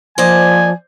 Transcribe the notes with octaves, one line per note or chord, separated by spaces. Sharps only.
F3 A#3 C5 D5 D#5 G#5